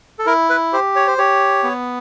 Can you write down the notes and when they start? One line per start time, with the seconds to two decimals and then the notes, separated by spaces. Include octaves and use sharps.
0.19 A4
0.26 E4 A#4
0.50 B4
0.73 G4 C5
0.96 C#5
1.07 C5
1.18 G4 C#5
1.64 B3